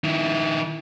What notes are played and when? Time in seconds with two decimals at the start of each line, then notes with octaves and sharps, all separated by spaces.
0.04 D#3 E4